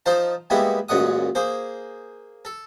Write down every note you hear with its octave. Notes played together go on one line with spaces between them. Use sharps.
F3 D#4 F4 C5 A5
G3 G#3 A#3 B3 E4 F#4
A1 F#2 A#2 G#3 F#5 D#6
A#3 G#4 C5
A4